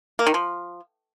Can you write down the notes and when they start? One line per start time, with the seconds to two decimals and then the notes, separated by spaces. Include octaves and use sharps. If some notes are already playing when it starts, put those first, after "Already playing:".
0.19 A#3
0.27 D#3
0.34 F3